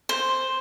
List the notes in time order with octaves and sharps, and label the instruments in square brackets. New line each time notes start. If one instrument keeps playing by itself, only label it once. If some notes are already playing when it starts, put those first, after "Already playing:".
[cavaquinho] C5